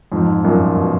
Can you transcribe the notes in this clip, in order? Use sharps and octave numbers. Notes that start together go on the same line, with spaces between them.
F2 G#2
F#2 A#2
B2